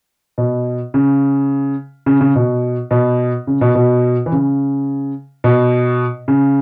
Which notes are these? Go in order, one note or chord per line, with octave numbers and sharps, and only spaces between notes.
B2
C#3
C#3
C#3
B2
B2
C#3
B2
B2
E3
C#3
B2
C#3